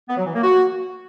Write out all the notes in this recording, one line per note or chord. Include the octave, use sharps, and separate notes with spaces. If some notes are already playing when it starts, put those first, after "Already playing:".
B3
F#3
E3
A#3
F#4